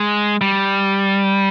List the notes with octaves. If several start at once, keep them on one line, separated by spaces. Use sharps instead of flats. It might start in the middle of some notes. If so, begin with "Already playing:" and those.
Already playing: G#3
G3